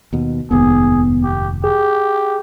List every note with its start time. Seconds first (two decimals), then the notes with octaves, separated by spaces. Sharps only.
0.13 D#2 B2
0.51 F1 D#2 G#2 B3 G#4
1.24 G4
1.64 G4 G#4